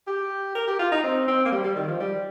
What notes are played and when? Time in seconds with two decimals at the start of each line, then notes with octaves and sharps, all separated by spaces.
0.07 G4
0.55 A#4
0.67 G4
0.79 F4
0.91 D#4
1.03 C4
1.28 C4
1.45 A#3
1.52 G3
1.63 G3
1.76 D#3
1.88 F3
2.00 G3